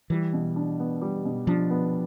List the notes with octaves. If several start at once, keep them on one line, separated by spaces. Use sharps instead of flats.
E3 G3
B2
D4
B3
G3
B2
F3 D4
B3